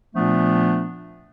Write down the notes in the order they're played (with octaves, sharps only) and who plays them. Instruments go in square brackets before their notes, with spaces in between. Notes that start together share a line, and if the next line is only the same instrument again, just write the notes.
[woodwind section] A#2 F3 A3 B3 D4